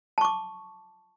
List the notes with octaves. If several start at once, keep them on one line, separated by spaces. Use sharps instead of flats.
A5 C#6 D6